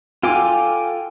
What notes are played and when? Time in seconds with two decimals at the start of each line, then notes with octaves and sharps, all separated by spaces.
0.23 F4 A4 G5 G#5 D6